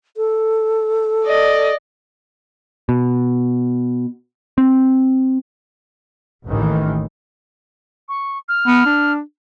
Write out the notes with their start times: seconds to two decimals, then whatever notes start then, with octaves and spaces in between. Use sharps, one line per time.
0.17 A4
1.24 D5 D#5
2.89 B2
4.58 C4
6.46 A1 D#2 A2 D#3 E3
8.09 C#6
8.49 F6
8.67 B3
8.85 D4